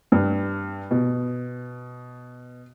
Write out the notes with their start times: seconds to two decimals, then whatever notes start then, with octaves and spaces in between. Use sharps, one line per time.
0.12 G2
0.91 B2